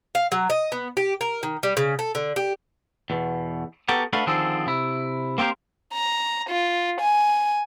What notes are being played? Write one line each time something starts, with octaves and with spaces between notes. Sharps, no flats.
F5
F#3
D#5
B3
G4
A#4
D#3
G3
C#3
A4
D3
G4
E2 B2
B3 F#4 G4 A4 A#4
A3 D4 F#4 B4 F5
D3 D#3 F3 C4 G#4 A4
C3 E4
A#3 C4 G4 A#4 C5
A#5
F4
G#5